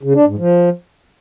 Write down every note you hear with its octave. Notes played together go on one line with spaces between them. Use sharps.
C#3
D4
G#2
F3